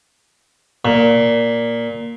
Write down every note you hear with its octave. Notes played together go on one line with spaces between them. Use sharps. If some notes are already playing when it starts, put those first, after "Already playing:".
A#2